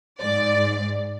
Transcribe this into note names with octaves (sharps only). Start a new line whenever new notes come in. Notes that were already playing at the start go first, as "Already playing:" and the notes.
G#2 D5